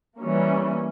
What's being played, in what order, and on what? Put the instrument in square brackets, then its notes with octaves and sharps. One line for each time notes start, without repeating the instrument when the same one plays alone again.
[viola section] E3 G3 A#3 C#4